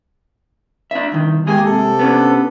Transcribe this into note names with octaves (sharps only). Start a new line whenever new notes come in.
D4 E5
C2 D#3
G#3 A#3 G4 G#4 G#5
C3 A4
B3 C#4 D4